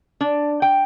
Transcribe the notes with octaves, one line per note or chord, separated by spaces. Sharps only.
D4
G5